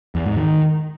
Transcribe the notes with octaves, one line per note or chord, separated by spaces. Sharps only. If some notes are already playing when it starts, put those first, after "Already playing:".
E2
G#2
D#3